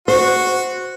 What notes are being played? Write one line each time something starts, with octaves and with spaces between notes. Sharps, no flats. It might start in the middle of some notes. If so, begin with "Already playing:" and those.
F#4 C5